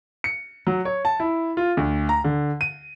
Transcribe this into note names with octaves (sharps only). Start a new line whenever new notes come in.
C#7
F#3
C#5
A5
E4
F4
D2
A#5
D3
D#7